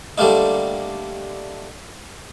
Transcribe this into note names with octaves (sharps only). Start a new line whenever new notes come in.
D3 G3 A3 A#3 D#4